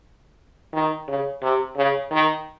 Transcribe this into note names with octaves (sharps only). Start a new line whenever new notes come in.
D#3
C#3
C3
C#3
D#3